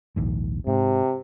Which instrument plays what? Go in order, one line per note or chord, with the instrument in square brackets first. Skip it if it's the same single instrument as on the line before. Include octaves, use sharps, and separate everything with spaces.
[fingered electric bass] A#1 D#2 G#2
[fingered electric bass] G#2 [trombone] C3